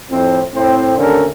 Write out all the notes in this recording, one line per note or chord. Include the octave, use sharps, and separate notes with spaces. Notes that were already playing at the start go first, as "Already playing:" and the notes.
F2 A2 C4
A2 C4
D#2 D3 A3 C#4 A4 A#4